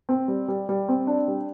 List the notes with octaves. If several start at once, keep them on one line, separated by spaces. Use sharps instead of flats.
C4
G3
G3
G3
C4
D4
G3